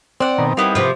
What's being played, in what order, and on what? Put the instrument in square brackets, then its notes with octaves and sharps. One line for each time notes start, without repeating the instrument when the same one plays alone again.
[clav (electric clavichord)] C4 [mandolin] D5 F#5
[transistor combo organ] B2 D#3 A#4
[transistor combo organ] G3 D#4 [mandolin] A#3 B3 E4
[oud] C3 F3